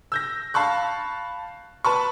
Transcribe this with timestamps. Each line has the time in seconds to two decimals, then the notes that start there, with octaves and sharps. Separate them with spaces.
0.12 E6 G6 A#6
0.54 F5 A5 B5 C#6 F#6
1.85 B4 A5 B5 C#6